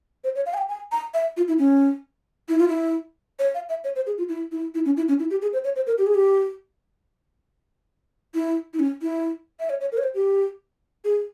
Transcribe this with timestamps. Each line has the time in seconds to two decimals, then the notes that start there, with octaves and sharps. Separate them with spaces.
0.24 C5
0.36 C#5
0.46 F5
0.54 G#5
0.58 G5
0.69 G#5
0.92 A#5
1.14 E5
1.37 F4
1.48 E4
1.59 C#4
2.49 E4
2.59 F4
2.68 E4
3.39 C#5
3.54 F5
3.69 E5
3.84 C#5
3.96 C5
4.07 G#4
4.18 F4
4.29 E4
4.52 E4
4.75 E4
4.85 C#4
4.97 E4
5.08 C#4
5.19 E4
5.30 G4
5.42 G#4
5.53 C5
5.64 C#5
5.76 C5
5.87 A#4
5.98 G4
6.07 G#4
6.15 G4
8.35 E4
8.74 E4
8.79 C#4
9.02 E4
9.60 E5
9.70 C#5
9.81 C#5
9.92 A#4
9.98 C#5
10.04 C5
10.14 G4
11.04 G#4